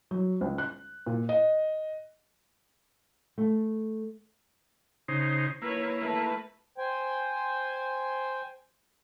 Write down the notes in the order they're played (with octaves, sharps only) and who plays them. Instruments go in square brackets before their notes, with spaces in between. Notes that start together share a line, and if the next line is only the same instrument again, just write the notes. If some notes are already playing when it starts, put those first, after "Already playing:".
[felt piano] F#3
C#2
F#6
A#2
D#5
[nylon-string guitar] A3
[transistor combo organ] C#3 D#4 C5
[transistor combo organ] A#3 E4 [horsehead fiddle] B4 C#5
[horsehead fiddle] A3 B4
[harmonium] C5 G5 G#5